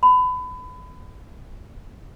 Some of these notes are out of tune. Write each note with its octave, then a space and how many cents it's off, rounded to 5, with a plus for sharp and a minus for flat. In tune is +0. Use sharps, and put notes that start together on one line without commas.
B5 +25